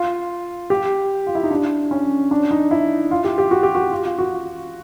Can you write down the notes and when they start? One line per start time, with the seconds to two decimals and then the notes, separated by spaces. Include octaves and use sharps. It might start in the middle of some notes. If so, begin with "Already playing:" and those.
Already playing: F4
0.70 G4
1.27 F4
1.35 E4
1.43 D#4
1.51 D4
1.91 C#4
2.31 D4
2.51 D#4
2.71 E4
3.11 F4
3.24 G4
3.38 G4
3.51 F#4
3.63 G4
3.75 F#4
3.91 F4
4.05 F4
4.18 F#4